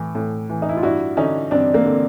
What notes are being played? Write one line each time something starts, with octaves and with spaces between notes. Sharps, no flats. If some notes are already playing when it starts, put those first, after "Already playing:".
Already playing: A2 E3
A2
E3
D#4
E4
F4
G2 E4 F#4
D3 C#4 D#4
G2 C4 D4
A#3 C4
D3